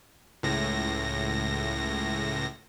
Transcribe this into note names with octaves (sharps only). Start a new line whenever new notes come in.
C#2 A2 A#6